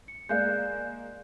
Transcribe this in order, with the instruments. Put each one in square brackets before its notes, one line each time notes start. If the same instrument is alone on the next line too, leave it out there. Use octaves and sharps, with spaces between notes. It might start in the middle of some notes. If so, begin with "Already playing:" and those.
[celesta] C#7
[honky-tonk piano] G#3 A#3 [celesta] D5 F#6 G6